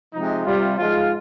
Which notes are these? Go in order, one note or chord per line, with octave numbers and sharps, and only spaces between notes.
C3 F3 G#3 D#4
C3 G3 F4
G#2 F3 G#3 F4